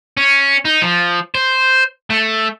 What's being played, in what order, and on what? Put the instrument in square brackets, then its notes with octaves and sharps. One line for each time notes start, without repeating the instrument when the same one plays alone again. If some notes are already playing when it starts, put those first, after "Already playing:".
[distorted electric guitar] C#4
D#4
F3
C5
A3